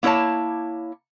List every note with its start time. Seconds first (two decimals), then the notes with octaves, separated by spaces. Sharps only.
0.03 A#3 E4 A4 C#5 A5